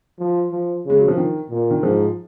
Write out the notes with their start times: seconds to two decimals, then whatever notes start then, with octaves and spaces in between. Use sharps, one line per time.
0.19 F3
0.52 F3
0.85 C#3 G#3
0.99 F#3
1.08 F3
1.17 D#3
1.50 A#2
1.71 D#3
1.83 G#2 F3